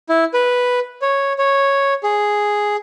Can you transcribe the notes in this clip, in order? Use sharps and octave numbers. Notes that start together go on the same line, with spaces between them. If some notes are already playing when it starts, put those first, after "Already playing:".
E4
B4
C#5
C#5
G#4